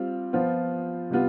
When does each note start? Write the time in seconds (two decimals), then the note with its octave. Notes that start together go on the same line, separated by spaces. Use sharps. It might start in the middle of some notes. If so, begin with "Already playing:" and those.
Already playing: G3 C4 F4
0.33 F3 B3 F4 C5
1.10 C3 G3 B3 F4